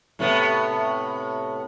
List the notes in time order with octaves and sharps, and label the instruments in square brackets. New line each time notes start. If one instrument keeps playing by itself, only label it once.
[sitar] A2 C3 B3